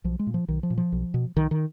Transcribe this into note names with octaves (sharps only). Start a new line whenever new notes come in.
B1 F3
G#3
A#2
F3
B1 D#3
F3
A#2
F3
B1
B2
B1 D#3
D#3